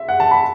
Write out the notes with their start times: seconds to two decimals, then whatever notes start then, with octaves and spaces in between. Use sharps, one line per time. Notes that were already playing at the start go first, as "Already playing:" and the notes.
Already playing: E5
0.09 F#5
0.20 A5
0.31 B5